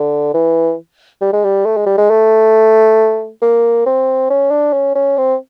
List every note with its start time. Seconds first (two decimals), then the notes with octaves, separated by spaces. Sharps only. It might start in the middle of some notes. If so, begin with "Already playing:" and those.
Already playing: D3
0.34 E3
1.21 G3
1.33 G#3
1.44 G3
1.65 A3
1.77 G#3
1.86 G3
1.98 G#3
2.10 A3
3.42 A#3
3.86 C4
4.30 C#4
4.51 D4
4.73 C#4
4.95 C#4
5.18 C4